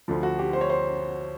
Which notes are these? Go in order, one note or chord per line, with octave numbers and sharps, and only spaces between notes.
D2 D3 F3
F#4
G4
C5
C#5
C5